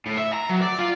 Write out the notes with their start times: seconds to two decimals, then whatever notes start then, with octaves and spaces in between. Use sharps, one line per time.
0.06 A2
0.18 E5
0.34 A#5
0.50 F#3
0.62 D5
0.79 F4